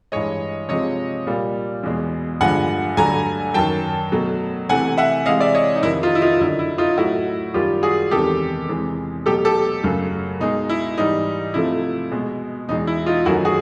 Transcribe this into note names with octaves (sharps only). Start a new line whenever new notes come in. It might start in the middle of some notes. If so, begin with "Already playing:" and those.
G2 E3 G#3 C#5 D#5
C3 F3 G#3 C#5 D#5
A#2 G3
E2 B2 G#3
G2 D3 F3 G#3 F#5 G#5
G2 D3 F#3 A3 G#5 A#5
F#2 D#3 F#3 G5 A5
B2 F#3 A3
C3 E3 A3 F#5 G#5
E5 F#5
C3 E3 G#3 D#5 F5
D5 E5
C#5 D#5
D#4
F2 C3 D#3 E4
D#4 F4
E4
D#4 F4
F#2 D3 F#3 E4
E4
D#4 F4
A2 F#3 A3 E4 F#4
F#2 D#3 G3 F4 G4
F#4 G#4
E2 C3 D#3 G#3 G4 A4
E2 C3 E3 G#3
B2 F#3 A3 G4 A4
G4 A4
F#2 C#3 F#3 A3
B2 G#3 D#4
E4
G#2 E3 G3 D#4
C3 F3 A3 E4
B2 G#3
E2 B2 G#3 D#4
E4
D#4 F4
F#2 D#3 F#3 A3 E4 F#4
F#4 G#4